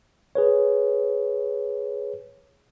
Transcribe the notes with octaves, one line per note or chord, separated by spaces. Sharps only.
G#4 B4 C#5